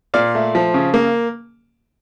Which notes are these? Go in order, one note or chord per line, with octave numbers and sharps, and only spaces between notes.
A#2 D5 F5
A3
F3
C#3
A#3